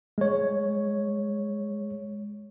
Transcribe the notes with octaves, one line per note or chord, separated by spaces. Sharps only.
G#3 C#5